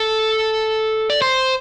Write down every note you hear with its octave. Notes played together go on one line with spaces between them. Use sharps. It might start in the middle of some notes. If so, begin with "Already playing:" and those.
Already playing: A4
D5
C5